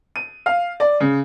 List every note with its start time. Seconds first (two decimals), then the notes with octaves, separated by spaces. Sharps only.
0.16 D#7
0.46 F5
0.80 D5
1.00 C#3